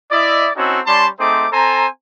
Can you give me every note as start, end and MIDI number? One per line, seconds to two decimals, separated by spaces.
0.11 0.47 64
0.11 0.47 74
0.11 0.47 75
0.55 0.78 60
0.55 0.78 61
0.55 0.78 63
0.55 0.78 64
0.55 0.78 66
0.55 0.78 69
0.86 1.06 55
0.86 1.06 61
0.86 1.06 74
0.86 1.06 81
0.86 1.06 84
1.18 1.46 57
1.18 1.46 60
1.18 1.46 63
1.18 1.46 68
1.18 1.46 72
1.18 1.46 86
1.52 1.86 60
1.52 1.86 69
1.52 1.86 72
1.52 1.86 80
1.52 1.86 82